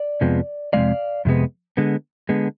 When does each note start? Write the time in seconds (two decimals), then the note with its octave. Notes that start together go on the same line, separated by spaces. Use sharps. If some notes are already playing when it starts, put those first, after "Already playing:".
Already playing: D5
0.21 F2 C3 F3 G#3 B3
0.73 F2 C3 F3 G#3 D5 F5
1.25 F2 C3 G#3 B3
1.77 D3 G#3 B3
2.29 D3 G#3 B3